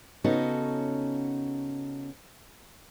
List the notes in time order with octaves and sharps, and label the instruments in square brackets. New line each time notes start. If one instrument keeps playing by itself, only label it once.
[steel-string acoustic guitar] C#3 B3 C#4 D#4 F#4 A4